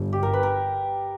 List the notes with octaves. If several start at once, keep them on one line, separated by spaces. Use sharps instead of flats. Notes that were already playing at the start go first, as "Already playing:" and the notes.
Already playing: G1
G4
A#4
B4
A#4